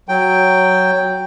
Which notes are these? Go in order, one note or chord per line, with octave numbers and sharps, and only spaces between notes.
F#3 G5